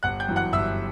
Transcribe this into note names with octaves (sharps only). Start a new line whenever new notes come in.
G1 F#5 F#6
G5 G6
F#2 E3
F#5 F#6
G1 E5 E6